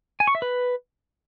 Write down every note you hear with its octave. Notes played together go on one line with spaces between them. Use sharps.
G#5
C#6
E5
B4